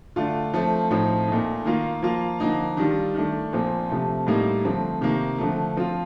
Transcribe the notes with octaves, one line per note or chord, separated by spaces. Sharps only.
D3 A3 D4 F4
F3 A3 C4
A2 F3 C4 D#4
A#2 A3 D#4
D#3 A#3 F4
F3 A#3 F4
D3 F3 A#3 D#4
D#3 G3 D4 F4
D#3 A3 D4
A#2 F3 C4
C3 F3 A3
A2 G3 A#3 D#4
D3 F3 A3 C4
C3 D#3 A#3
D3 F3 A3
F3 C4 F4